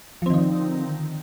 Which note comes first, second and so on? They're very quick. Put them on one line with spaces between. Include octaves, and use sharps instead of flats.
F3 C4 D#3 D#4 D3